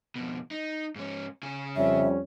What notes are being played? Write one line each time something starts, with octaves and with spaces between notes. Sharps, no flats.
F2 B2
D#4
G#2 C#4
C#3 G#5
F2 G3 C#4 E5